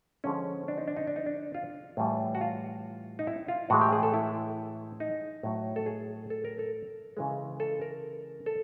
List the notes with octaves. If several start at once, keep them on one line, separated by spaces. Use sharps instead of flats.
D3 F3 G#3 C#4
D4
D#4
D4
D#4
D4
D#4
D4
F4
A2 E3 G3
F#4
F4
D#4
E4
F4
A2 E3 G#3 F#4
G4
G#4
A4
E4
D#4
A2 F#3
A4
G#4
A4
A#4
A4
C#3 E3 G#3
A4
A#4
A4